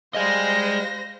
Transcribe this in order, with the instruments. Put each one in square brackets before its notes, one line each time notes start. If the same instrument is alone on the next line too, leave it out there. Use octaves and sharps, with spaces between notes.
[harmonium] G3 F5 [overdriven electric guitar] G#4 D#5 [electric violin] C5 A#6